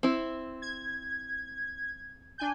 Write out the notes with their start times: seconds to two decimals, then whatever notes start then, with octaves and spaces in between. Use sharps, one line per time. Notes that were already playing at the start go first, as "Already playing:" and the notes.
0.03 C4 E4
0.62 G#6
2.38 D4 G#5 G6